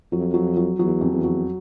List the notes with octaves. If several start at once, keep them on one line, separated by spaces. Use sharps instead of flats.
F2 F#3
F#3
F#3
E2 F#3
F2
E2
F#3